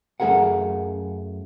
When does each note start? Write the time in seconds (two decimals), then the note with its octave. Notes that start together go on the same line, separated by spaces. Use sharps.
0.20 F#2 A3 G4 G#4 A#4 F#5